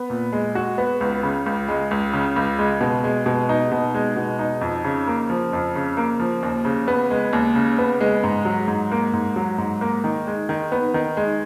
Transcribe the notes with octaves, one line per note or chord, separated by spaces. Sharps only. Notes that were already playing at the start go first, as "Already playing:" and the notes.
Already playing: B3
A#2
G#3
F#4
B3
C#2
C#3
C#2
G#3
C#2
C#3
C#2
G#3
B2
G#3
B2
D#4
B2
G#3
B2
D#4
F2
C#3
A#3
F3
F2
C#3
A#3
F3
D#2
C#3
B3
G#3
D#2
C#3
B3
G#3
G#2
F#3
G#2
A#3
G#2
F#3
G#2
A#3
D#3
G#3
D#3
B3
D#3
G#3